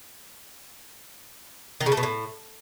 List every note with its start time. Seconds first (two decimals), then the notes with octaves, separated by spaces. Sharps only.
1.81 D#3
1.86 C#3
1.92 A3
1.97 B2
2.03 A2